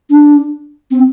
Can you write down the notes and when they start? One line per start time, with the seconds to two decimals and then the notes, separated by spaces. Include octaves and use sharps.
0.10 D4
0.91 C4